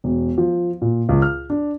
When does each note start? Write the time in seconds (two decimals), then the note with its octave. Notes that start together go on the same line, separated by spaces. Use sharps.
0.04 E1
0.38 F3
0.82 A#2
1.09 C#2
1.22 F6
1.50 D4